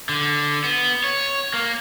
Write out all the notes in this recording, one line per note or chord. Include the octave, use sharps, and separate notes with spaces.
D3
B3
C#5
A#3